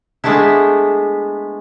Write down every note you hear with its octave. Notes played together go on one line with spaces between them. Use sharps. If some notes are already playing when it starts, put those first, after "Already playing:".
G#3 A3 B3 D4 E4